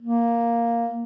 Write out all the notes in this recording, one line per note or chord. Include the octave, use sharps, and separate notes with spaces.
A#3